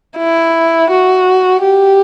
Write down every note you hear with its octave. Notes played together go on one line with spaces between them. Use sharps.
E4
F#4
G4